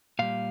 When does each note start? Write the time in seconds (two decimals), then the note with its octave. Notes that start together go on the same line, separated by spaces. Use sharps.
0.19 A#2 G3 F5